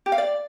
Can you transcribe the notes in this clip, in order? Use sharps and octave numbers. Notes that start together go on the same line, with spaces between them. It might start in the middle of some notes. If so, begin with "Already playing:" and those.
G4
F5
D5